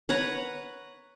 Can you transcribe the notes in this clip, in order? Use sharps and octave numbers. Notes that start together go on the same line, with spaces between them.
B4 C#5 F#5 A#5